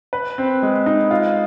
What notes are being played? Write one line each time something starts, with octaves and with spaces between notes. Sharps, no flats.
B4
C4
G#3
D#4
F4